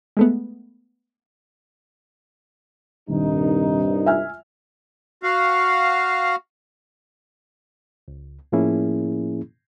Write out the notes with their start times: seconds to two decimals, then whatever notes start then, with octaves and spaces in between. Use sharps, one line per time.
0.17 G#3 A3 B3
3.09 D#1 C2 G2 D#4
4.06 E5 G#5 F6
5.23 F#4 F5
8.08 C#2
8.52 A2 F3 A#3 C#4 E4 G#4